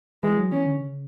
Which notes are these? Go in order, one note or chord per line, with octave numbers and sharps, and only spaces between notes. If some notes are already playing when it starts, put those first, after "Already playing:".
E3 G#3
F#3
E3 C#4
D3
C#3